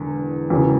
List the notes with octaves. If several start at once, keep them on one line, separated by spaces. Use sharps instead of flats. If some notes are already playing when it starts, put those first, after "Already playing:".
Already playing: E1 E2 D3
E1 E2 C#3 F#3